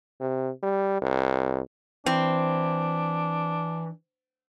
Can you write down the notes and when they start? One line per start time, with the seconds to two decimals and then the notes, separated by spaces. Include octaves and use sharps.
0.21 C3
0.63 G3
1.02 C2
2.06 E3 C4 D4